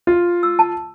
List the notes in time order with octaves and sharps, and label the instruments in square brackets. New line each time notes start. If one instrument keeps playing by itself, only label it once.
[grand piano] F4
[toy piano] E6
A5